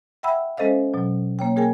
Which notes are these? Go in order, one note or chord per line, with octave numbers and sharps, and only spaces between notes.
E5 F#5 G5 B5 E6
G#3 C#4 A4 C5 D#5 F5
B2 F#3
A#3 C#5 G5
A#3 G#4 A#4 G5 G#5